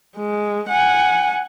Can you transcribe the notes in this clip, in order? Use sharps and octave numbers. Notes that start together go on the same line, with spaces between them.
G#3
F#5 G#5